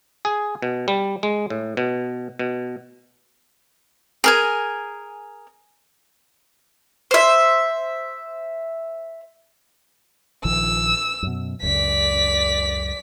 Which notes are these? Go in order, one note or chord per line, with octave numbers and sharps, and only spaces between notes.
G#4
B2
G3
G#3
A2
B2
B2
G#4 A#4 G#5
C5 E5
A#1 D#3 F3 E6
F#2 B2
C#2 F#2 D5 B6